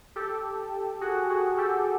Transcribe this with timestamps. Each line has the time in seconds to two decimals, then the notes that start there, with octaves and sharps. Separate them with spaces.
0.16 G4 A4
1.01 F#4 G#4
1.30 F#4 G#4
1.58 G4 A4